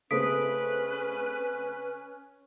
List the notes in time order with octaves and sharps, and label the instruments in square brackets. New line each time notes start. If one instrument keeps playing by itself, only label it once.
[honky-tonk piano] C#3 A3 C4 [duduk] C#4 [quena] B4 [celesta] D#6 B6 D7